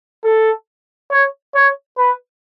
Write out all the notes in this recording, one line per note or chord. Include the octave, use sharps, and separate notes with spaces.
A4
C#5
C#5
B4